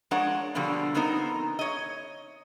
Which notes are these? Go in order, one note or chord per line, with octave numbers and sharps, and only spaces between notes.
F3 G#3 D4 A#4 C#5 F#5
B2 D3 F3 G3 A#3
D3 B3 C4 D#4 A#4
C#5 D#5